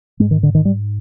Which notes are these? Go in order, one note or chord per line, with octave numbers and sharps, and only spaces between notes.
G#2 G#3
D#3
D3
D#3
G3